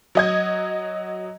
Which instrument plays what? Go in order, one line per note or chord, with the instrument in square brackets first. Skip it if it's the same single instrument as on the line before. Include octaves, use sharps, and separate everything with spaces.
[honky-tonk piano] F#3 D#5 G#6